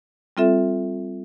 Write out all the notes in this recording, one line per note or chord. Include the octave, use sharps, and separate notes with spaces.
G3 C4 F4 A4 E5